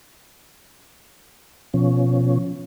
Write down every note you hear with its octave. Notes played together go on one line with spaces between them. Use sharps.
B2 F3 C#4